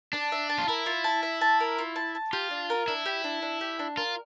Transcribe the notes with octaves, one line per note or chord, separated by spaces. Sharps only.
D4 A5
E5
A5
F4
E4 A#4
F4
A5
E5
A5
A#4
F4
A5
A5
F4 G4
D4
A#4
D4 E4
G4
D4
D4
G4
D4
F4 A#4